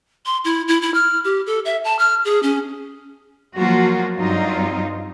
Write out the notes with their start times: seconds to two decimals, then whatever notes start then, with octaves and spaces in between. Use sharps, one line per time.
0.26 C6
0.45 E4
0.68 E4
0.82 E4
0.94 F6
1.25 G4
1.47 A4
1.65 E5
1.84 A5
1.99 F6
2.25 G#4
2.43 C#4
3.56 F3 F#3 A#3 F4 F#4
4.17 G2 F#3 C4 D#4 F4